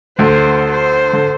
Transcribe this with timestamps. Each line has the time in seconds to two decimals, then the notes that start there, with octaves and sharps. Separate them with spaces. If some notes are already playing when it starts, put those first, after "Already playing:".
0.18 D2 D3 C5
0.71 C5
1.13 D3